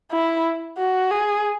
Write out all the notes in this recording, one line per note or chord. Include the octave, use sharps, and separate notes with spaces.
E4
F#4
G#4